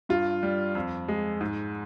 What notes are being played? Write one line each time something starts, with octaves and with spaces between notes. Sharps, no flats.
G2 F4
G3
F2
G#3
G#2